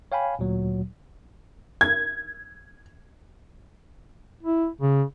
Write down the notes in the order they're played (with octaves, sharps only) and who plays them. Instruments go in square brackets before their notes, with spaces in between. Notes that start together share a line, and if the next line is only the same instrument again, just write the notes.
[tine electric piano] C#5 F5 G5 G#5 B5
D2 A#2 F#3
[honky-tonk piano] G#6
[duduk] E4
C#3